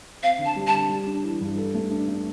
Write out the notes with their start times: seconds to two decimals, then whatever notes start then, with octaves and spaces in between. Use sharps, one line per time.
0.23 C4 F5
0.39 D3
0.45 A5
0.56 G3
0.67 A5
0.74 D3
0.89 G3
1.07 D4
1.24 E3
1.41 G2
1.58 A4
1.75 A3
1.91 D4
2.08 A3